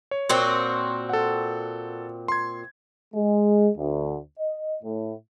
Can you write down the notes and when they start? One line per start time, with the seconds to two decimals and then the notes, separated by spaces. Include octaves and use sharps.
0.11 C#5
0.29 A#2 C4 F#4
1.09 A4 F#5
2.28 C6 G#6
3.15 G#3
3.77 D2
4.39 D#5
4.83 A2